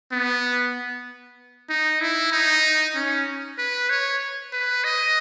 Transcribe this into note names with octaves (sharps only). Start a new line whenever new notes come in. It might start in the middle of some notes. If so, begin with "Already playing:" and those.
B3
D#4
E4
D#4
C#4
B4
C#5
B4
D#5